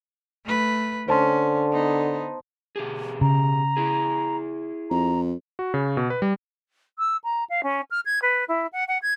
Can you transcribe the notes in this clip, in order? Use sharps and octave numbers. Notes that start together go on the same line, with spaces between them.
A3 B4
D3 C#4 C5 A5 C6
B3 D#4
B2 G4 G#4
C#3 A#5
E4 G#4
F2 A#5
F#4
C#3
B2
B4
G3
E6
A#5
F5
C#4
F6
G#6
B4
E4
F#5
F#5
G#6